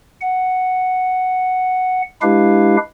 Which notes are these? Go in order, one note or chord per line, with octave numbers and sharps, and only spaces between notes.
F#5
G#3 D4 E4 G4 B4 F5